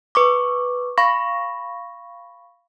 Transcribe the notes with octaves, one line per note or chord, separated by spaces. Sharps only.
B4 C#6 D6
F5 B5 C#6 A#6